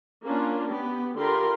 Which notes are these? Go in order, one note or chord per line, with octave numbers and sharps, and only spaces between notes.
A#3 C#4 D4 F4
B3 G4
D3 F4 G4 A#4 B5 C6